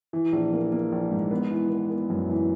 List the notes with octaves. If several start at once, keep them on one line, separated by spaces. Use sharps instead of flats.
E3
A#1
A#3
A#3
A#1
G#2
B3
E3
B3
B3
F#2
E3